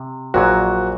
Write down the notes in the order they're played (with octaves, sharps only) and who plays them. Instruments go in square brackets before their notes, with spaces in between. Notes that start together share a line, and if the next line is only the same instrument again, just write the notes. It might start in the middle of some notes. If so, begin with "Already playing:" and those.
Already playing: [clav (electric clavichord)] C3
[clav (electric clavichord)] A#1 A#2 F#3 [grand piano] F#4